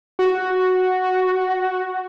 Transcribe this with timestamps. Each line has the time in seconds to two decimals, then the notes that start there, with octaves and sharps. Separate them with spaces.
0.19 F#4